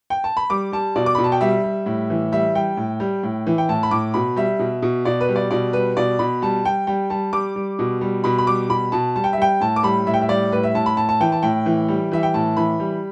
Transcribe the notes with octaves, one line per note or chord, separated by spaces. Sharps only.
G5
A5
B5
G3 D6
G3 A5
B2 D5
D6
B2 B5
A5
G5
G3 E5
G3
A2
E3
G3 E5
G3 G5
A2
G3
A2
E3
G5
A2 A5
B5
A2 D6
B2 B5
G3 E5
B2
B2
B2 D5
B4
G3
D5
B2 D5
G3 B4
B2 D5
B2 B5
G3 A5
G3 G5
G3 G5
G3 A5
G3 D6
G3
B2
G3
B2 B5
B5
G3 D6
B2 B5
B2 A5
G3 A5
G5
E5
G3 G5
A2 A5
D6
G3 B5
A2 E5
G5
E5
G3 D5
A2 B4
E5
A2 A5
B5
A2 A5
A5
E3 G5
A5
A2 G5
E3
G3
E3 E5
G5
A2 A5
E3 B5
G3